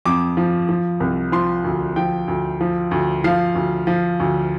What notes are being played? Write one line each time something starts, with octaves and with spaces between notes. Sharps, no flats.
F2 D6
F3
F3
C2
F3 C6
D2
F3 G5
D2
F3
D2
F3 F5
D2
F3
D2